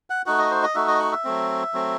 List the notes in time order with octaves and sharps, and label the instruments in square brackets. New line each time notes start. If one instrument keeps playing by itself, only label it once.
[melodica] F#5
A3 D#4 F#4 F#5
D#5
C5
D#5
A3 D#4 F#4 E5
D#5
F#5
E5
F#3 A3 C4
F#3 A3 C4